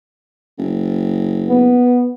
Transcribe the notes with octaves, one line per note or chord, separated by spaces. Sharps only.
F#1
B3